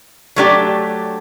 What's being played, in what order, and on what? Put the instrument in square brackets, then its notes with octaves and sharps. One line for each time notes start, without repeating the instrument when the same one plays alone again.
[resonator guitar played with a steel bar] F#3 A3 D4 G4